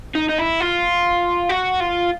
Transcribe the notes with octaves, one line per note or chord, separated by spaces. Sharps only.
D#4
D#4
E4
F4
F#4
F4